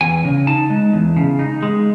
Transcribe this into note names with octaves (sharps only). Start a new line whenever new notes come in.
E2 G#5
C#3
D#4 A5
G#3
E2
C#3
D#4
G#3